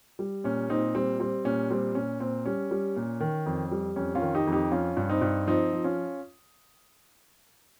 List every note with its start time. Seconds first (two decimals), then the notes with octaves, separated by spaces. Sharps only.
0.19 G3
0.44 A#2 C#4
0.69 A#2 C4 D#4
0.95 G3 C4
1.20 G3 C4
1.45 A#2 C#4
1.70 G3 C4
1.95 A#2 C#4
2.20 A#2 C4
2.46 G3 C#4
2.71 G3
2.96 A#2
3.20 D#3
3.46 F2
3.71 G3
3.96 F2 C#4
4.15 C#4 F4
4.21 D#3
4.34 D#4 G4
4.47 F2
4.52 D#4 G4
4.71 F3 C#4 F4
4.97 G2
5.09 C4 D#4
5.22 G2
5.47 F3 C4 D#4
5.73 F3
5.84 C#4 F4